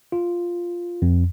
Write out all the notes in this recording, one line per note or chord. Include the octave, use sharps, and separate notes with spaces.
F4
F2